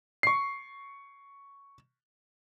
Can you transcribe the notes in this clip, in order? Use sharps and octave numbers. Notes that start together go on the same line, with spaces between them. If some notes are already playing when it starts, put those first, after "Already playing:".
C#6 C7